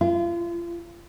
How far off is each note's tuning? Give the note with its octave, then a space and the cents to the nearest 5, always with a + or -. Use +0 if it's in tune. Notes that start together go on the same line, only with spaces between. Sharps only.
F4 -35